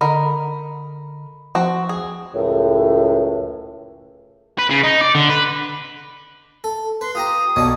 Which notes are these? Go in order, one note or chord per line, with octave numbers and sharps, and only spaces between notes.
D3 D#4 A#4 B5
F3 C4 F#4
G#4
C#2 F#2 A2
B4
C#3
D#4
D5
D3
B4
A4
B4 C6
F4 G4 A#5 D#6
B1 C#5 D5 A5